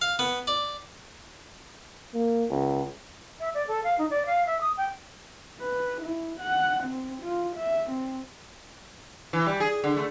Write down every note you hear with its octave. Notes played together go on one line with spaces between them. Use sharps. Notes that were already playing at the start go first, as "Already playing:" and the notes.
F5
B3
D5
A#3
C#2
E5
D5
A4
F5
D#4
D5
F5
E5
D#6
G5
B4
E4
F#5
C4
F4
E5
C4
E3
G3
G#4
D3
A3